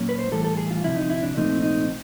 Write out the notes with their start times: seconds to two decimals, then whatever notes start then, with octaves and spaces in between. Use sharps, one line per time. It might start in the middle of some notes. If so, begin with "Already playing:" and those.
Already playing: A#2 F#3 A#3 C#4
0.09 B4
0.19 C5
0.31 A2 E3 G3 A4
0.44 A4
0.57 G#4
0.71 F4
0.84 D2 C3 F3 E4
0.96 D#4
1.10 E4
1.23 D4
1.36 C2 A#2 F3 A3 C4 D#4
1.62 D#4